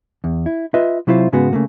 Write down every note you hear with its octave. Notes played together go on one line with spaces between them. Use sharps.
E2
E4
F4 B4 D#5 E5
C3 F#3 E4 F4 C5
G#2 C#3 G#3 B3 F#4
C#3 A3 A#3